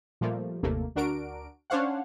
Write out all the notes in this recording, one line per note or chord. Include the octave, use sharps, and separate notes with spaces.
A#2 F3 G3 A3 A#3
G1 D#2 C3 A3 A#3
D2 D4 F#4 A#4 D7
C#4 D4 C5 C#5 F5 F#5